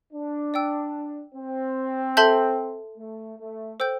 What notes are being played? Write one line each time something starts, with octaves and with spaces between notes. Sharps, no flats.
D4
D5 G5 E6
C4
A4 E5 A5 C6 G6
A3
A3
A4 C5 G5 E6 G6